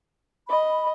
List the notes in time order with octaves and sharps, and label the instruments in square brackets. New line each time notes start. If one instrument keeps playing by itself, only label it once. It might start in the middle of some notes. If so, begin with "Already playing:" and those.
[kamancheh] D#5 [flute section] B5